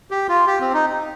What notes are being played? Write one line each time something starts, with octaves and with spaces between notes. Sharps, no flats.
G4
F4
G4
C4
D#4